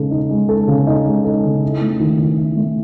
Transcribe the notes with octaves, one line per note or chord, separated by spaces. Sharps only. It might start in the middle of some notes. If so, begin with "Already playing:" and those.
Already playing: C#3 G#3 D#4 A4
D#4
G#3
A4
C#3
D#4
G#3
A4
C#3
E4
A3
D#3
D#3
E4
A3